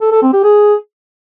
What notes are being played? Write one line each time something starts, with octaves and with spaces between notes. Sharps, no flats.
A4
A4
C4
G4
G#4